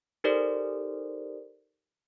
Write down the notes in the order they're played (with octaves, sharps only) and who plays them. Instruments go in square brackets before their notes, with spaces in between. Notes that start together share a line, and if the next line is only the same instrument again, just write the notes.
[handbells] D#4 G4 A4 A#4 C5 D5